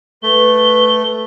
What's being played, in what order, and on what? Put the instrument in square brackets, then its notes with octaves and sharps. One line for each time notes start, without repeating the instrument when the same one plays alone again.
[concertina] A3 [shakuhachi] B4 [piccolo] G7